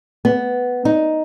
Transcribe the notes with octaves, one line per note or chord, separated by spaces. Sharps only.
B3
D#4